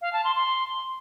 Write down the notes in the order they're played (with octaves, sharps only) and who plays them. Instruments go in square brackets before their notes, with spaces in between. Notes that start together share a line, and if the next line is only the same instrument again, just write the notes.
[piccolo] F5
A5
C6
C6